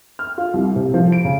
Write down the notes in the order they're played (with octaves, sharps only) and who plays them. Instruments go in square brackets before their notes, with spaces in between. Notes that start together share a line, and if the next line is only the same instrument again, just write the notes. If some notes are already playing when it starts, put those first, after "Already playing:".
[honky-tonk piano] F6
F4
C2
C3
F3
D7
C#3